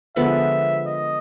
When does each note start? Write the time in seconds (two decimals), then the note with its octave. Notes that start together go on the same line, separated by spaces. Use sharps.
0.16 D3 F3 G#3 B3 E5
0.87 D#5